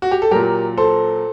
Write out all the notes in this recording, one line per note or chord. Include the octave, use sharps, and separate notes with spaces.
F#4
G4
A4
A#2 F#3 G4 A#4
A4 C5